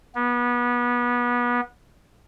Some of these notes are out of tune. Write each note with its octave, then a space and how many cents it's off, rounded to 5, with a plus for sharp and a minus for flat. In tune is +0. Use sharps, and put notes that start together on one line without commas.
B3 -25